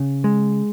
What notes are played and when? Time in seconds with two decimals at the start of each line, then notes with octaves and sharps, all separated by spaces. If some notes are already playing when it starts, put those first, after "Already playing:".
Already playing: C#3
0.24 G#3